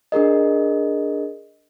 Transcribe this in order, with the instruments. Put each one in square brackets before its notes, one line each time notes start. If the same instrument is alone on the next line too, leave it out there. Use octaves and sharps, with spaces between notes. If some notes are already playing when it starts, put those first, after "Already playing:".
[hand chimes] D4 G#4 A#4 D#5